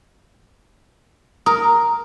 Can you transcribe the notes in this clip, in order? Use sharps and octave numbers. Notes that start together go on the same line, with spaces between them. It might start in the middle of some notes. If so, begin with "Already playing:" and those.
A#4 D#6